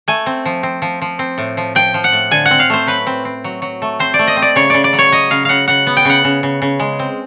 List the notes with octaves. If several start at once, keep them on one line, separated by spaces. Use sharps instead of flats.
A3 G#5
C4
F3
C4
F3
F3
C4
A2
F3
F3 G5
F3
F#5
A2
D3 G#5
F#5
C4
F5
A3 C5
F#3 B4
C4
C4
F#3
F#3
A3
C4 C5
D5
A3
D#5
C4
D5
C#3 C#5
C#3 D5
D5
F#3
C#5
F#3 D#5
C#3 F5
C#3 F5 F#5
C#3 F#5
B3
G5
C#3 F#5
C#3
C#3
C#3
G#3
C4